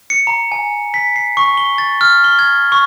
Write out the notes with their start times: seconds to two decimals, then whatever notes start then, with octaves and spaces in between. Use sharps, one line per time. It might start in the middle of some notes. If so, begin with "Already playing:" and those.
0.10 C#7
0.27 A#5
0.52 G#5
0.94 B6
1.16 C7
1.37 C#6
1.57 G7
1.78 A6
2.01 F6
2.24 G7
2.39 G#6
2.72 C#6